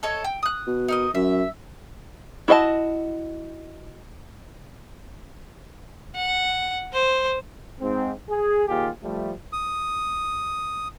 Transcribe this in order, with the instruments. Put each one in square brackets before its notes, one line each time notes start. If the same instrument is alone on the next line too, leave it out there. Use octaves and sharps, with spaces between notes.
[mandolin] A4 C#5 D#5
G5
D#6 F#6
[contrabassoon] B2
[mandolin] D#4 A#4 D#5
[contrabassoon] F#2 [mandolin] E5
[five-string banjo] E4 F#4 D#5 E5 A5
[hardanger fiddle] F#5
C5
[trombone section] G#2 C4
G#4
D#2 A#2 F4 G4 G#4
F3 G3 A3
[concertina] D#6